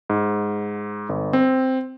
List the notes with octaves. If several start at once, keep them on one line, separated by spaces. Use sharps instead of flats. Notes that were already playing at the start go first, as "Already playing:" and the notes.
G#2
G1
C4